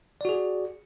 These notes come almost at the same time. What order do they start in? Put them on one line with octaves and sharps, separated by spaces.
D5 F#4 G#4